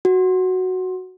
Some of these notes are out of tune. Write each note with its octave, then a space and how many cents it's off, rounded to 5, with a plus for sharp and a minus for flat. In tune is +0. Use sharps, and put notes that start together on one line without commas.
F#4 +0